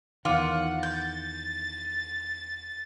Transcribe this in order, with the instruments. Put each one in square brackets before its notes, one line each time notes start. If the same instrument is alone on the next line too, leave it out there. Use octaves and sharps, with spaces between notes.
[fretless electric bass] E2 D#3 [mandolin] F4 C#5 D6 [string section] F#5
[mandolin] G6 [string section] A6